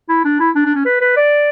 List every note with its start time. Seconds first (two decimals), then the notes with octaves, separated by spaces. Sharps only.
0.09 E4
0.24 D4
0.39 E4
0.55 D4
0.65 D4
0.75 C#4
0.85 B4
1.01 B4
1.16 D5